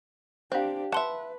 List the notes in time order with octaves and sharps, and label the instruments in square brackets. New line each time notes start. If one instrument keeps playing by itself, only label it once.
[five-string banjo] C4 [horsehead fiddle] D4 G4 [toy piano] C5 F5
[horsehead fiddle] B4 [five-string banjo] E5 F#5 [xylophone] A5 C6